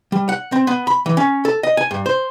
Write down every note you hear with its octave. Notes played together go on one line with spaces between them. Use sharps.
G3
F#5
C4
B3
B5
E3
C#4
A4
D#5
G#5
G2
C5